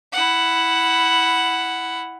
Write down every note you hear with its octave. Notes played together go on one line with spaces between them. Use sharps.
E4 F#5